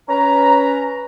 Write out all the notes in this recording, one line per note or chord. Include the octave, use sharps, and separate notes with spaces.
C#4 B4 A#5